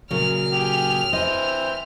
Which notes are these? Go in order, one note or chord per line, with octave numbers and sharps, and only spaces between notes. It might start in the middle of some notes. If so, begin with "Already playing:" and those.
A#2 C#3 F#3 F6
G4 G#4
E3 C4 C5 D#5